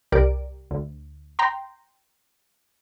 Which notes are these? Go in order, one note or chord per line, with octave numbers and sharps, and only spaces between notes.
C2 G4 A#4 D5 D7
D2
G5 A#5 C6